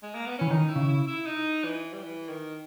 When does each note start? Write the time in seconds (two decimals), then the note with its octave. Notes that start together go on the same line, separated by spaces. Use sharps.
0.03 G#3
0.15 A#3
0.26 B3
0.39 E3 C#4
0.50 D#3 D#4
0.69 E4
0.76 C#3
0.88 E4
1.07 E4
1.26 D#4
1.65 E3
1.93 G3
2.04 E3
2.29 D#3